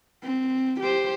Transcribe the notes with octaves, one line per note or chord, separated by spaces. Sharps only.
C4
G4 C5